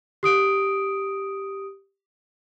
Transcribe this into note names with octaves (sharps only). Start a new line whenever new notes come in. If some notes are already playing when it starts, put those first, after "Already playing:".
G4 D#6 D7